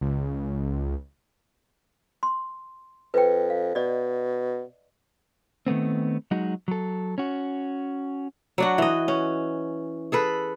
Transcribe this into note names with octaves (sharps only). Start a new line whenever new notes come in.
C#2
C6
F2 B4 G5
F5
B2 D5 D#5
D#3 A3 B3 C4
F#3 G#3 D#4 F#4
F#3 A4
C#4 F#4
F#3 D4 F#4
E3 D#5
C#4
G#4 A4 B4